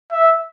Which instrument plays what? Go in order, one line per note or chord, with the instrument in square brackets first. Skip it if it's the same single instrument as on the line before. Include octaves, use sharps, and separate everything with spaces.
[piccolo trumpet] E5